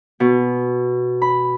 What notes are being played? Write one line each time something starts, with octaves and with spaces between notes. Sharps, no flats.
B2
B5